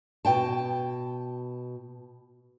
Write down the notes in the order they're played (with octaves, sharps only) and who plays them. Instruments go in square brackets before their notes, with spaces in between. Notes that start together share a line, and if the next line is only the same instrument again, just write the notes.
[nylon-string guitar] B2 G5 A5